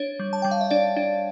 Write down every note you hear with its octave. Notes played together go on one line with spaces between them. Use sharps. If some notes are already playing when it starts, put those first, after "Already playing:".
Already playing: D4 C#5
G3
A5
G3 G5
F5
E5
D4 D5
D4